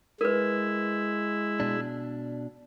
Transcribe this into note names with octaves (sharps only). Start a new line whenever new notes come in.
G#3 E4 A#4 B4
B2 D4